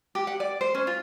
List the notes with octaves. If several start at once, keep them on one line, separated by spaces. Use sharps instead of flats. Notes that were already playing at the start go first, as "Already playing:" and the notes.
G4
F#5
D5
C5
C#4
F4